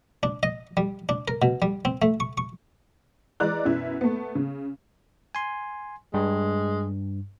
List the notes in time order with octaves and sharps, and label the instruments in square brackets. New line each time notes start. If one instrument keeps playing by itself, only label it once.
[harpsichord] D4
D#5
G3
D4
A#4
B2
G3
C4
A3
C#6
C#6
[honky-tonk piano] E3 G#3 D5 A#5 F#6
F#2 B2 E4 E5
A3 B3
C#3
[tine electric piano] G#5 C6
[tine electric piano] G2 [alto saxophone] G#3